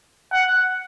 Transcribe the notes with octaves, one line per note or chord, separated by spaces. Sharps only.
F#5